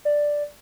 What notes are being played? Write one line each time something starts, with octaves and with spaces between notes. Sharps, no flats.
D5